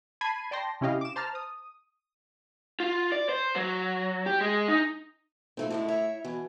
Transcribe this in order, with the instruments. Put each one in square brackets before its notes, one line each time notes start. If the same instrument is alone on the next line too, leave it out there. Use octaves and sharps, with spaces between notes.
[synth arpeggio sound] A5 B5 G#6 C7 D#7
D5 G5 A5 C6 A#6
C3 C#4 E4 G4 D#5 F5
D6 E7
C5 A5 A#5 F6
D#6
[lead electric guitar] F4
D5
C5
F#3
G4
G#3
D#4
[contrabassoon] B1 [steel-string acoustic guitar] A#2 A3 C4
[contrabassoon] A2 [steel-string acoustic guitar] D3 G#3 E4
[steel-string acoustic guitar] E4 C#5 E5
[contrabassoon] B2 [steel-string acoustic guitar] E3